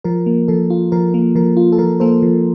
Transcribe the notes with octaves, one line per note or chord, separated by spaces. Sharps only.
F3 A#4
A#3
F3 A4
F4
F3 A#4
A#3
F3 A#4
F4
A4
F3 A#4
A#3 A4 C5
F3